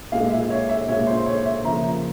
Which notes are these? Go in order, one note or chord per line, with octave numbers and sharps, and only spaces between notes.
A#2 G#3 F5
E5
C#5
E5
A#2 G#3 C#5
C5
C#5
E5
C#3 F3 A#3 A#5